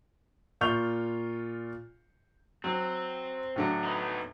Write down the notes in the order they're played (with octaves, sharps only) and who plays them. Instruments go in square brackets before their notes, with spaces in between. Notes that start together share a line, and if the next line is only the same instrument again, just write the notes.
[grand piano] A#2 F4 C#6 G6 F7
[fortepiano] F#3 [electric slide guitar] C4
[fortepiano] A2 D3 F#3
[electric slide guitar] B3 D#4